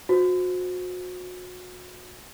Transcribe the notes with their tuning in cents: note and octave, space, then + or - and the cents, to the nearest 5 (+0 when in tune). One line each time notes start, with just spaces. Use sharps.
F#4 -30 C5 -15